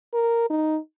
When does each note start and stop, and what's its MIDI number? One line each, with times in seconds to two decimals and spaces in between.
0.14 0.50 70
0.50 0.78 63